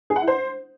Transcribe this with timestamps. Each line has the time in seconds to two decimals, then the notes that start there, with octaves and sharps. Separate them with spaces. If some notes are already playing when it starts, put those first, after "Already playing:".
0.10 G#4
0.16 F#5
0.22 E4
0.28 C5